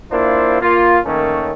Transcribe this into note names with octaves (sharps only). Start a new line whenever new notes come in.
A#3 D4 E4 F4 C5
A#3 F4
D#3 A3 A#3 C#4